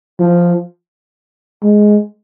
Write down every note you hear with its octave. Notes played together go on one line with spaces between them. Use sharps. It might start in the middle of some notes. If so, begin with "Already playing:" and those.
F3
G#3